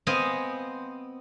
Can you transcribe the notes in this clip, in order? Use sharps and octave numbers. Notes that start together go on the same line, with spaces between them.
B3 C4 C5 D#5 F5 G#5